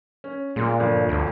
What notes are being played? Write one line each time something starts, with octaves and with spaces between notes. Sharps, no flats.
C#4
A#2 G#3 F4
G1 F2
D2